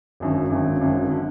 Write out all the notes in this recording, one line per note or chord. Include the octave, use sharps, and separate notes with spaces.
G#1 F#2 D3
G#1 F#2 D3
G#1 F#2 D3
D3